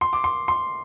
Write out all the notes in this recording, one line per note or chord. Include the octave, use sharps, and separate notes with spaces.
C6
D6
C6
C6